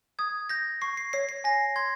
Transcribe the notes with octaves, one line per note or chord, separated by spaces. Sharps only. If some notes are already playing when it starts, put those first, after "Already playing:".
D#6 G#6
G6 A#6
C#6 C7
C7
C#5 C7
C7
G#5 A#6
C6 G#6